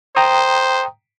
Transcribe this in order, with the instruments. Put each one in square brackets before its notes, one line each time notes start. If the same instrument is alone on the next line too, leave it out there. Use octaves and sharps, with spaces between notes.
[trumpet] C5 [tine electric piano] G5 A#5 D#6